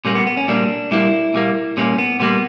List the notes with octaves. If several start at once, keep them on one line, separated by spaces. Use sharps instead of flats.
A#2 G3 A#3 C#4
B3
B3
C#4
A#2 G3 A#3 D4
A#2 G3 A#3 E4
A#2 G3 A#3
A#2 G3 A#3 C#4
B3
A#2 G3 A#3 B3